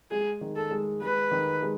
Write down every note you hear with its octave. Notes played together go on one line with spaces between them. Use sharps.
G#3 G#4
D#3
A4
G#3
G#3 B4
D#3
G#3